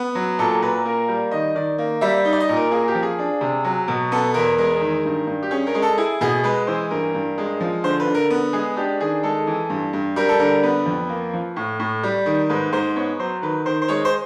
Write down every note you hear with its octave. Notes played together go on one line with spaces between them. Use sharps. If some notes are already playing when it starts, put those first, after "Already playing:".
Already playing: B3
F#3
A#2 A4
A#2 B4
A#3 A#4
G3
D#3 D#5
D#3 D5
A#3
G3 E5
D#4
D5
D#5
A#2
A#4
A#3 G#4
G4
F3
G#4
D4
C3
F#3
B2
B3 A4
E2 A#4
G#3 A#4
D#3
G2
G2
G4
C#4 G#4
A#4
G#3
A4
E4 G#4
B2 G#4
G#3 B4
E3 C5
G2 A#4
G2
G#3
F3
D3 C5
B4
D3
A#4
B3
G#3 G#4
D4 G4
D#3 G#4
G#3 A4
E3
G2
G2
G3 A#4
A4
D3 A#4
B3 B4
F2
A#3
F3
A2
A2
G3
D#3
G#2 B4
G#2 C5
B3 C#5
F#3 C5
D#3 B4
D#3 C5
C5
G#3 C#5
C5